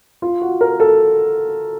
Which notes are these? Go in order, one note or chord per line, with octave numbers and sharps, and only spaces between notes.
F4
F#4
A#4
A4